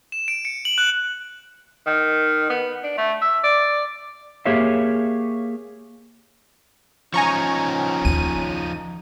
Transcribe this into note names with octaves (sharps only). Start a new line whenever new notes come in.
E7
D7
C#7
F#7
F#6
D#3
B3
D4
A3
E5
D5
A#3 G4 G#4 C#5 E5 F5
F3 C#4 D#4 G#5 A#5 C#6
D#2 D#7